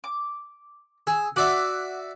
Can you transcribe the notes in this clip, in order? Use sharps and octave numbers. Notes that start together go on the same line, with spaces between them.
D6
G#4 E6
F#4 D5 E5 F#5 D6